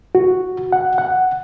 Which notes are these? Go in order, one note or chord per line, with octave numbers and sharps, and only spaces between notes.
F#4
F#5
F#5